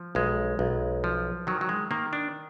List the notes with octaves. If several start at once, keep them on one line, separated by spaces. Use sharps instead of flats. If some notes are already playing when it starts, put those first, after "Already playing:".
Already playing: F3
B1 G#3
B1
F3
D#3 F#3
F#3
G#3
D#3 A#3
D4